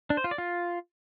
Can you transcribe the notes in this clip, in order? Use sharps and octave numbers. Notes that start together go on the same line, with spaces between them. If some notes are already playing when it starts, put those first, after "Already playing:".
D4
C5
F4
D5
F4